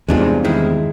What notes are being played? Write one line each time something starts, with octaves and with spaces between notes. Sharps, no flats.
E2 G2 C3 G#3 D4 F4
D#3 G#3 E4